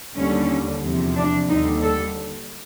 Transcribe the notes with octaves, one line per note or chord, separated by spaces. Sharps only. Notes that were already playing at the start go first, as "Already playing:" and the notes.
D#2 D3 G3 C#4
E2 C3 F3
D4
D#2 D3 G3 D#4
A4